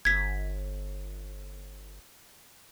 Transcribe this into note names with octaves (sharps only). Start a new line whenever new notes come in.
G1 G#6 B6